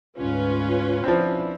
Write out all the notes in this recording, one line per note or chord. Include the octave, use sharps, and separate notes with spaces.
D2 G#2 C#4 F4 B4
F3 C4 D4 E4